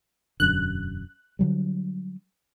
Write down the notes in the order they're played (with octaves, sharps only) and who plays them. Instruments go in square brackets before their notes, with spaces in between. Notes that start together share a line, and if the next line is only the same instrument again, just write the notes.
[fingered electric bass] E1 F#2 D3 [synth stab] F#6
[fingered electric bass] D3 F#3 G3